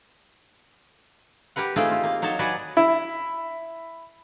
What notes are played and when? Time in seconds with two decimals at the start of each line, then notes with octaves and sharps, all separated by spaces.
1.56 G4 A#4 B4 F#5
1.76 A3 C4 D#4 F4 G4 G#4
1.91 F4
2.04 A#3
2.22 F#3 D#4 C#5 A5
2.39 F#3 F#4 B4 D5 G#5
2.77 E4